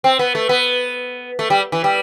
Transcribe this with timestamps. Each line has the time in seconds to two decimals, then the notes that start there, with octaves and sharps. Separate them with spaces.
0.04 C4
0.19 B3
0.35 A3
0.49 B3
1.39 A3
1.50 G3
1.72 E3
1.84 G3